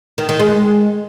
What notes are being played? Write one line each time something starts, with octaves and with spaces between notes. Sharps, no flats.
D#3
D#3
G#3